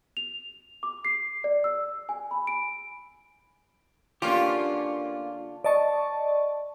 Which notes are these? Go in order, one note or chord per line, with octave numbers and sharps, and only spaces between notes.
F7
D6
C7
D5
E6
G#5
B5
D7
D3 A#3 C#4 F4 G4 F#5 C#6
D5 D#5 A5 C#6